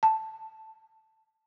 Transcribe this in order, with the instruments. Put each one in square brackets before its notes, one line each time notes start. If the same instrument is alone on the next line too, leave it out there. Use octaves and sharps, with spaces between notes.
[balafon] A5